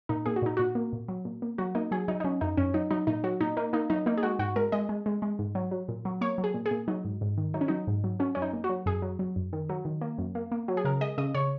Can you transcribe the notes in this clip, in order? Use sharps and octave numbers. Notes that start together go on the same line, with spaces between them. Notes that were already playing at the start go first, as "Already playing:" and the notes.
A#2 D#4
A#2 G#4
F#4
A#2 D#4
A#2 F#4
A#3
A#2
F#3
A#2
A#3
F#3 F#4
A#3 D#4
F#3 G#4
F#3 D#4
D#4
F#3 C#4
F#2 D#4
F#2 C#4
F#3 D#4
F#3 D#4
A#2 D#4
F#3 F#4
A#2 D#4
A#3 D#4
A#3 D#4
F#3 D#4
A#3 D#4
G#4
G#3 F#4
G#2 F#4
G#3 A#4
G#3 D#5
G#3
G#3
G#3
G#2
F#3
F#3
A#2
F#3
A#3 C#5
F#3
G#4
A#2
G#4
A#2
F#3 D#4
G#2
G#2
D#3
F#3 D#4
C#4
F#3 D#4
G#2
F#3
F#3 C#4
F#2 C#4
D#4
A#3
F#4
F#3
F#2 G#4
F#3
F#3
F#2
D#3
F#3
D#3
A#3
F#2
A#3
A#3
F#3
G#4
C#3 A#4
G#3 D#5
C#3 D#5
C#3 C#5